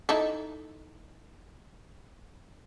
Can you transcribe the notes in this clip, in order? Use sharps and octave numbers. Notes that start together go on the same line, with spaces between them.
D#4 E4 A4